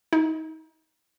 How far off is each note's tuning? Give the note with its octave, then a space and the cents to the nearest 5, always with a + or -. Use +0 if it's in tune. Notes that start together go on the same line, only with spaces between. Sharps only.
D#4 +30